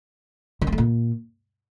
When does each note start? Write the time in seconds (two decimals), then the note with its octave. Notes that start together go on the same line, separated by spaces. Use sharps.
0.61 D#3
0.67 G#3
0.72 A3
0.78 A#2